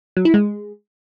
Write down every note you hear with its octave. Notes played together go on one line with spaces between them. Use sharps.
F#3
E4
G#3